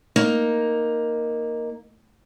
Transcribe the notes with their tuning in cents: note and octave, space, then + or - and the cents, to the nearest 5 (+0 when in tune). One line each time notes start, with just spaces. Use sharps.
A#3 +0 D#4 +0